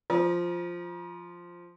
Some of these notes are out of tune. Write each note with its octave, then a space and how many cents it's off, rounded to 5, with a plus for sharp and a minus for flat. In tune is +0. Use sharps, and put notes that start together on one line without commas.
F3 +0 A#5 +40